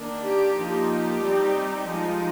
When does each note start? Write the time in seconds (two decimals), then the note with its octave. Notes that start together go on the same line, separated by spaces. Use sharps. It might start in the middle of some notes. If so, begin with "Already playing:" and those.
Already playing: D#3 A#3 D4
0.23 G4
0.56 F3 A#3 D#4
0.89 G4
1.22 G3 C4 D#4
1.87 F3 G#3 D#4